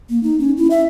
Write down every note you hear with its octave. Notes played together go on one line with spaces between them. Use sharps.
A#3
D#4
C#4
E4
E5